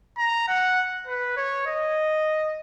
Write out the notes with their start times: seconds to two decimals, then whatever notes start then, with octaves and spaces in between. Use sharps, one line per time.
0.18 A#5
0.48 F#5
1.07 B4
1.37 C#5
1.66 D#5